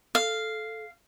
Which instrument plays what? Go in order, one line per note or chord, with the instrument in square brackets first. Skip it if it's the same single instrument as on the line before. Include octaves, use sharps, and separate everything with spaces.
[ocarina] A4 [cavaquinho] F5